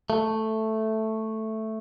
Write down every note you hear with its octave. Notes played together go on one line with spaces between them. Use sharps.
A3